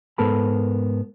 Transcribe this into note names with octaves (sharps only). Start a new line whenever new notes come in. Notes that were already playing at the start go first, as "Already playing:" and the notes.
G#2 B3 A4 A#4 A5 B5